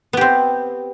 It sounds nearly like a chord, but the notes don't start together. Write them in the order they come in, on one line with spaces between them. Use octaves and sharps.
B3 G4 C4